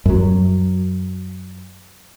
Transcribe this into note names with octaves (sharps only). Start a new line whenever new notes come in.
F#2 F#3